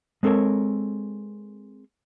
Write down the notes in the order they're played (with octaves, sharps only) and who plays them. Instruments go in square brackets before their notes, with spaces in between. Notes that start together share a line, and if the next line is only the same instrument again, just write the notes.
[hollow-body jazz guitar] G#3 C4 A4 A#4 C#5